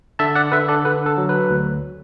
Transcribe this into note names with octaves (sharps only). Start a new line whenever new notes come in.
D3 E5 A5
D5 F#5
D3 B4 E5
A4 D5
D3 B4
A4
F#3
B4
D2